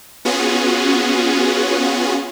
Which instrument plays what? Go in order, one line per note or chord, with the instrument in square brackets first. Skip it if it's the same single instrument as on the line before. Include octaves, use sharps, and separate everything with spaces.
[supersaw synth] B3 C#4 F4 F#4 G#4